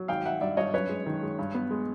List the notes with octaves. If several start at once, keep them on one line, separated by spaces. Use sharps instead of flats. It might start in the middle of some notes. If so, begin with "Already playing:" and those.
Already playing: F#3
G#1 F5 G5
G#1 E5 F#5
G2 D5 E5
G2 C#5 D#5
F#2 B4 C#5
G#3
D#3
G#3
G2
B3
G#3